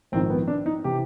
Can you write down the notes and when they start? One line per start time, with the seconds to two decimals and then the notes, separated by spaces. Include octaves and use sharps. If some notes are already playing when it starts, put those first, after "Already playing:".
0.12 A#1 G#2 D#3 C4
0.30 B3
0.48 D4
0.66 D#4
0.84 C3 E3 G4